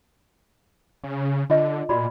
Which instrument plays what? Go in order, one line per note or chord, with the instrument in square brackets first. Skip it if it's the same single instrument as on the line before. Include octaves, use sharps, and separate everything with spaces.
[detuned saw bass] C#3
[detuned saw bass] D3 [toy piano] F4 D#5
[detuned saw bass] A#2 [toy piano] F#4 D5 B5